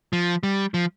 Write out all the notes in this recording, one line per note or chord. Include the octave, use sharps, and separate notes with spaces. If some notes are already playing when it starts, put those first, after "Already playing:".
F3
G3
F3